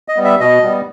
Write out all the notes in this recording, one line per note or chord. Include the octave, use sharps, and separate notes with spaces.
D#5
G3 B3
E5
B2 D#5
G3 B3